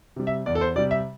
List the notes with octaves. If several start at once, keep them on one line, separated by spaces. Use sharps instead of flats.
C3 G3
E5
E2 D5
A4
C5
C3 G3 D5
E5